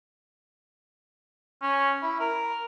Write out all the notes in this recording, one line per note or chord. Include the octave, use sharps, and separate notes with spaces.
C#4
E4
A#4